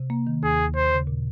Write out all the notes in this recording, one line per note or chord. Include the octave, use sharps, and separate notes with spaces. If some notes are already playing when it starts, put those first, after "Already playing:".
Already playing: C3
A#3
D#3
D#2 G#4
D#2
D#2 C5
C#3
A#2